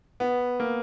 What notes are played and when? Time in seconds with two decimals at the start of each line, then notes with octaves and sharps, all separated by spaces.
0.20 B3
0.60 A#3